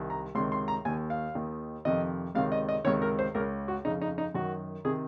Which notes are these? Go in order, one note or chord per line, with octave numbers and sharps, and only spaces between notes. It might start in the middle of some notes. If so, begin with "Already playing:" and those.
Already playing: C2 D#3
A#5
C#2 C3 D#3 C6
C6
A#5
D#2 D#3 G#5
F5
D#2 D#3
F2 C3 D#3 D#5
C#2 C3 D#3 F5
D#5
D#5
C#2 C3 D#3 C#5
A#4
C5
C#2 C#3 A#4
F#4
F2 C#3 D#4
D#4
D#4
F#2 D#3 F#4
C3 D#3 G#4